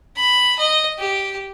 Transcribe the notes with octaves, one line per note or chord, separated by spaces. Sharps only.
B5
D#5
G4